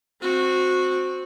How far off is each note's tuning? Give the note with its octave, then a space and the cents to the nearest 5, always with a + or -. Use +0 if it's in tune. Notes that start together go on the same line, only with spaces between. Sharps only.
C4 +0 F#4 -15